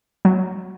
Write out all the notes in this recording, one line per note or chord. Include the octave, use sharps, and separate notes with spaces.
F#3